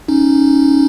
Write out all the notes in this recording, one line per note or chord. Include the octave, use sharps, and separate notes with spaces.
C#4 D#4